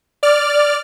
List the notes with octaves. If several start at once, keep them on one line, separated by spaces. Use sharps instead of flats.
D5 F6